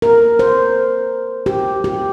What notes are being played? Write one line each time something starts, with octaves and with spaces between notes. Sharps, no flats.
A#4
C5
G4
G4